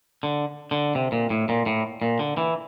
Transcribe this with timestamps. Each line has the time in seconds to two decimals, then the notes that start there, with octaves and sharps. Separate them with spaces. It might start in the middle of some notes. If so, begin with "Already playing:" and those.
0.23 D3
0.71 D3
0.95 C3
1.12 A#2
1.30 A2
1.49 A#2
1.66 A2
2.02 A#2
2.19 D3
2.37 E3